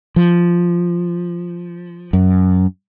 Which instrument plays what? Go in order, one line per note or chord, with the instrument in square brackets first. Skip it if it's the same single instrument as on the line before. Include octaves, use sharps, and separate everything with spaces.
[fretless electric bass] F3
F#2